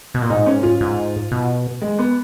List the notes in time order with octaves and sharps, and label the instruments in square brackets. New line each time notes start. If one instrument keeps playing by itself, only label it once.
[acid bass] B2
A#2
[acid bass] G#2 [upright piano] D#4
[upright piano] C#4
F4
[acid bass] G#2
B2
[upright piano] G#3
B3